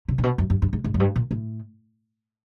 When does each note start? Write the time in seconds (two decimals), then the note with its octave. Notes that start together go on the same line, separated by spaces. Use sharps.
0.08 C3
0.18 A#2
0.23 B2
0.38 F#2
0.50 G2
0.62 G2
0.73 G#2
0.84 G#2
0.94 F#2
1.00 G2
1.16 A#2
1.31 A2